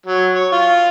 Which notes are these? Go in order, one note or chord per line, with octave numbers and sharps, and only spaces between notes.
F#3
C#5
F4